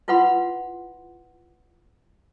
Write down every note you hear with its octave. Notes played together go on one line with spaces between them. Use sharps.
E4 F4 B4 F#5 B5 C6